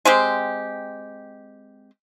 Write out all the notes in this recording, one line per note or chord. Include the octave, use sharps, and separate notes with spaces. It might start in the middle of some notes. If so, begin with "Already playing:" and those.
G#3 C4 G4